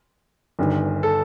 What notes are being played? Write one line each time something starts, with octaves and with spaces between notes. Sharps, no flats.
G1 G2 D#3
A4